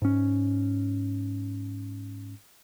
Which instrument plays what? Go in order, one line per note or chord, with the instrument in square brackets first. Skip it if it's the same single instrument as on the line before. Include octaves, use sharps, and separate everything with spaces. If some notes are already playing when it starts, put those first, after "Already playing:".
[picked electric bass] G#2 C#4